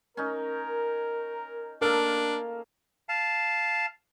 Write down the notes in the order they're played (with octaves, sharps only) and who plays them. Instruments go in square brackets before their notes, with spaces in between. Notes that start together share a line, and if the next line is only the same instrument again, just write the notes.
[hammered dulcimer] C#4 D#4 [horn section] A#4
[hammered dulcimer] A#3 A4 F5 [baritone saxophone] D4 [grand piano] A#4
[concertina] F5 A5